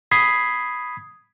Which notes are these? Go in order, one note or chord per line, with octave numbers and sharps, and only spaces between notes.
B5 D#6 G#6 B6 C7